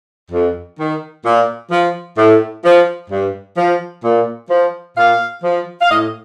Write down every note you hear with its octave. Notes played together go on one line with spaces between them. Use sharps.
F2
D#3
A#2
F3
A2
F3
G2
F3
A#2
F3
A#2 F5
F3
F5
A2 D#5